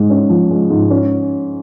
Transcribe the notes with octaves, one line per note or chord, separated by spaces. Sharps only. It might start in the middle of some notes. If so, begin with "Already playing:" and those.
Already playing: G#2 G#3
C#4
F3
G#3
G#2
C#4